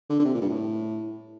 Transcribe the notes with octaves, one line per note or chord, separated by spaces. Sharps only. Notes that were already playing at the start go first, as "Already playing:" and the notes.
D3
D3
C3
A#2
G2
A2